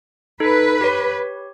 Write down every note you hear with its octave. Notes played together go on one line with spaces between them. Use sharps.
D#4 A4 B4
G4 C#5